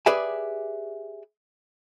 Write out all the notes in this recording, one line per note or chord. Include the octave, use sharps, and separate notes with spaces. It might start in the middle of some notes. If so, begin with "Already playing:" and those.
G4 G#4 B4 D5 E5 G#5